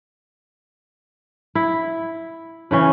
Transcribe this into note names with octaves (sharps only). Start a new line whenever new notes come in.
E4
C#3 E3 C#4